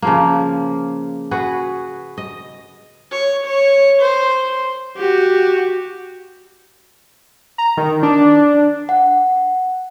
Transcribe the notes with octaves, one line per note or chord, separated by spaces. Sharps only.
C#3 F3 A#3
F#4 G#4 B4
D#5
C#5
C#5
C5
F#4 G4
A#5
D#3
D4
F#5